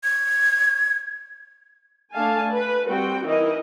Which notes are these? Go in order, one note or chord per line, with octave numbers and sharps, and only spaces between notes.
G#6
A3 D4 F5 G#5 A5
B4
G3 C4 F#4 G5
E3 D#4 E4 A#4 D#5